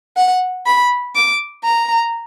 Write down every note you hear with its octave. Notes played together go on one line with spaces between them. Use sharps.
F#5
B5
D6
A#5